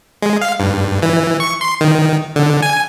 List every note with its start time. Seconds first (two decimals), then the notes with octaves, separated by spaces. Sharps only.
0.22 G#3
0.41 F5
0.60 G2
1.02 E3
1.40 C#6
1.61 C6
1.81 D#3
2.36 D3
2.63 G#5